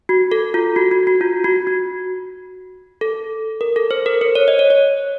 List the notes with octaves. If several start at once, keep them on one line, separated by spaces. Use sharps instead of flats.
F#4
A4
F4
F#4
F#4
F#4
F4
F#4
F#4
A4
A#4
A4
C5
A#4
C5
C#5
D#5
C#5
C#5